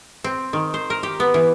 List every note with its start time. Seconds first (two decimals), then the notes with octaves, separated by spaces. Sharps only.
0.24 C4
0.53 D#3
0.74 C5
0.90 A#4
1.03 G4
1.20 B3
1.34 E3